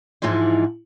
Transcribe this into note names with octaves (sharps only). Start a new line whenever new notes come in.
G#2 E3 F3 G#3 D#4